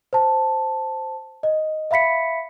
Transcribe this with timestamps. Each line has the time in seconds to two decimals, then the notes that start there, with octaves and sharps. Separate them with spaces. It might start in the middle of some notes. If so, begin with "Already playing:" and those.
0.13 C5 A5
1.43 D#5
1.91 E5 F5 B5 B6 C#7